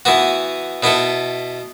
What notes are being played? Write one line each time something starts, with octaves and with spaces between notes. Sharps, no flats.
E3 B3 F#4
B2 B3 E4 A4